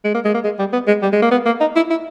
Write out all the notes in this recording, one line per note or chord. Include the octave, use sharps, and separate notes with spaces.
G#3
A#3
G#3
A#3
G#3
G3
B3
G#3
G3
G#3
A#3
B3
A#3
D#4
E4
E4